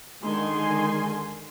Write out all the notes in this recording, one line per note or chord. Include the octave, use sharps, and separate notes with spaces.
D3 D#3 G#3 G#5 C6